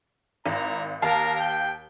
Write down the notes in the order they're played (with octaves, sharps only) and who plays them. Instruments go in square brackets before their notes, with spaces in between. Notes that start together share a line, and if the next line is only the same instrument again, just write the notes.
[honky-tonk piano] G#1 [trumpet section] E4 D5 A#5
[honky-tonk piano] D#2 F5 A5 [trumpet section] A#4
[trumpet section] G5